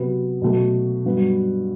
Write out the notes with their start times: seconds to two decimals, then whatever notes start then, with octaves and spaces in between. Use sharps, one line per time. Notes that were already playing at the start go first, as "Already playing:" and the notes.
Already playing: C3 F#3 B3
0.42 B2 F#3 A3
1.05 G2 F#3 B3